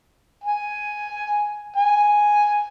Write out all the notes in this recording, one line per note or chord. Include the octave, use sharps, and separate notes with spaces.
G#5
G#5